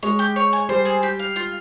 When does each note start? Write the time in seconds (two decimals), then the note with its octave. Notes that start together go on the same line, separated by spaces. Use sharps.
0.03 G#3 C#5
0.19 G4
0.36 C#5
0.53 G#5
0.69 G3 C5
0.85 G#4
1.03 G4
1.20 F5
1.36 F4